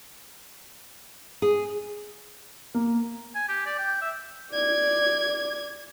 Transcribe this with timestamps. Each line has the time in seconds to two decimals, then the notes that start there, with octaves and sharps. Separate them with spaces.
1.42 G#4
2.74 A#3
3.35 G#5
3.48 G4
3.66 D5
3.78 G5
4.02 E5
4.52 D5 G#6